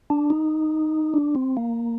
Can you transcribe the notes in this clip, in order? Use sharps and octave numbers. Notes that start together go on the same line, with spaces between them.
D4
D#4
D4
C4
A#3